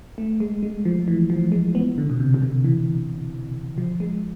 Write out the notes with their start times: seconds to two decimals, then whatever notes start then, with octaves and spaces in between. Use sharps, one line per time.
0.18 A3
0.40 G#3
0.63 G#3
0.85 F3
1.08 E3
1.30 F3
1.52 G#3
1.75 B3
1.98 D3
2.10 B2
2.20 C3
2.34 C3
2.42 D3
2.65 E3
3.78 F3
4.00 G#3